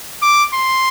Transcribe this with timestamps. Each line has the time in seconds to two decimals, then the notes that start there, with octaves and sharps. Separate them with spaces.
0.22 D6
0.54 C6